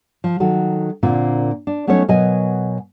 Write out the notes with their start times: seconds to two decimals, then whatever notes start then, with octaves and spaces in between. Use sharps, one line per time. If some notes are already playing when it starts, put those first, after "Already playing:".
0.24 F3
0.40 D#3 F#3 F#4 A4
1.03 A#2 D3 A#3 C4 F4
1.67 D4
1.87 F#3 A3 B3 C#4 D#4 C#5
2.08 B2 F#3 A#4 D#5 G#5